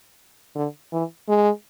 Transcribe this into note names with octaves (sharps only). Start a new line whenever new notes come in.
D3
E3
G#3